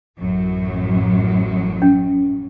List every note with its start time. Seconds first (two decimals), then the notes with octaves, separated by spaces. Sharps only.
0.17 A1 F#2 F#3
1.82 C#4